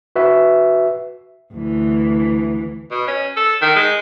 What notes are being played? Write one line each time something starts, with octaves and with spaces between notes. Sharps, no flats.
F#4 B4 E5
D2 E3
B2
C#4
A4
D#3
G#3